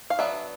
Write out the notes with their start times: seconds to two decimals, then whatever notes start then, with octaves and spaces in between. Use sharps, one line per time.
0.10 F5
0.19 F#3 B3 D4 E5